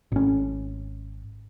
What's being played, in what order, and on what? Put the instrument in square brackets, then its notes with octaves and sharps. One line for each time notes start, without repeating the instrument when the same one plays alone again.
[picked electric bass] G#1 C#4